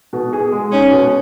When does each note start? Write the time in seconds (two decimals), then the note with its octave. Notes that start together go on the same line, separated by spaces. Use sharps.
0.13 B2
0.33 G#4
0.52 G#3
0.72 C#4 D#4
0.91 B2